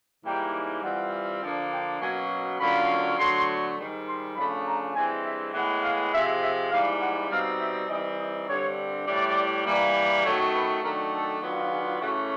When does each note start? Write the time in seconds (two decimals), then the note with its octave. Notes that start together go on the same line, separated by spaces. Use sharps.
0.24 G#2 E3 G3 A#3 D#4 G5
0.83 E3 G3 C4 F4 F#5
1.42 D3 F3 A#3 D4
1.72 G5
2.01 B2 F#3 A#3 C#4 G#5
2.60 D3 F#3 A#3 C#4 F4 B5
3.19 D3 F#3 A3 C6
3.78 G#2 D#3 G3
4.07 C6
4.36 C#3 F3 A3 D4 B5
4.66 A#5
4.95 G2 E3 G#3 C4 G#5
5.25 E5
5.54 A2 E3 G#3 B3 F#5
5.83 F5
6.13 C3 F3 G#3 E5
6.42 E5
6.71 G#2 E3 G3 A#3 F5
7.00 F#5
7.30 B2 G3 C4 D#4 F5
7.60 E5
7.89 E3 G3 C4 D#4 D#5
8.18 D#5
8.48 G2 D3 G3 C4 C#5
9.06 A2 E3 G3 D5
9.65 E3 G3 A#3
10.24 F#2 D#3 F#3 A3 C#5
10.54 B4
10.83 D#3 F#3 A3 D4 A#4
11.13 A4
11.41 D#3 F#3 B3 D4 F4
11.71 G#4
12.00 C#3 E3 A3 C#4 F#4